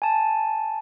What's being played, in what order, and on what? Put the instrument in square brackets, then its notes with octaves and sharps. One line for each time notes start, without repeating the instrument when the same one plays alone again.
[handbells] G#5 A5